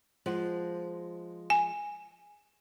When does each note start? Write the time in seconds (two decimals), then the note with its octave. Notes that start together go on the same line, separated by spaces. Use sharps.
0.26 F3 G#3 F#5
1.50 G#5